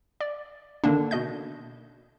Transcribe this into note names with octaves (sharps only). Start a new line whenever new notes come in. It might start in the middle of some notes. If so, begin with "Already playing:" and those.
D5
D3 D#3 A#3 D4
B2 D#5 G6